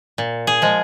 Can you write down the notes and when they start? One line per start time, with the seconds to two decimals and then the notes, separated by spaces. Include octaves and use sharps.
0.18 A#2
0.47 G#4
0.62 F3 G#3